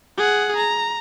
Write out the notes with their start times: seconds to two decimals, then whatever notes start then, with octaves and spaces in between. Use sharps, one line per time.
0.18 G#4 F#5
0.57 A#5